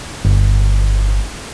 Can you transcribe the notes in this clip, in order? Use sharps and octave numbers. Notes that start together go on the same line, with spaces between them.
G1